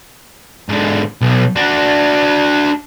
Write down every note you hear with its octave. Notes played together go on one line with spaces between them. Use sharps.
G#2 D3
B1
D4 F#4